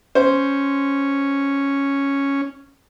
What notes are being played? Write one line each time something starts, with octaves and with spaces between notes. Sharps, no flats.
C#4 C5